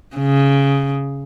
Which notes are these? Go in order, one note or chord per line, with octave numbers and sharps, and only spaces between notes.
C#3